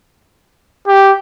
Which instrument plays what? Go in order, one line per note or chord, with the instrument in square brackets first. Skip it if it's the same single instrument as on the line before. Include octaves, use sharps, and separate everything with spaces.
[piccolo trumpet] G4